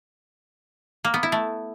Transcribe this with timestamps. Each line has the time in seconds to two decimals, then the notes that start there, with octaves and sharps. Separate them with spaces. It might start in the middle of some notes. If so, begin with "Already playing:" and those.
1.05 A#3
1.14 B3
1.23 E4
1.32 A3